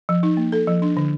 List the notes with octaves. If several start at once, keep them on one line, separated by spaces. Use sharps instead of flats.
F3
D#4
A#3
A4
F3
D4
D3